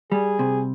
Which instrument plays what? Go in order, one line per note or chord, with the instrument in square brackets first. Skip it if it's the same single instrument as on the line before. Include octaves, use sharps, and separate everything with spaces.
[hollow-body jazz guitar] G3 [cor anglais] G#4
[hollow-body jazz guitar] C3